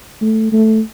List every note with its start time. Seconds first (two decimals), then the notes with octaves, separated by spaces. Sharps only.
0.21 A3
0.52 A3